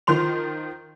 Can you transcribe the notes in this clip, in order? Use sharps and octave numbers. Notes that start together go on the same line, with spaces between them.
D#3 F3 C6 F7